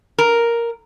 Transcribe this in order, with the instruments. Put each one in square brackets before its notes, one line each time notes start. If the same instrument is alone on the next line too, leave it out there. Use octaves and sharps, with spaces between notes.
[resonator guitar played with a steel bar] A#4